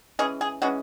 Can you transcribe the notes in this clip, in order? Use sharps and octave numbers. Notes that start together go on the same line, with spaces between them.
E3 G#3 C#4 G#4
G#4
E3 G#3 C#4 F#4